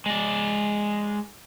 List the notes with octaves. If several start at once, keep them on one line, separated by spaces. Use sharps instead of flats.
G#3 D5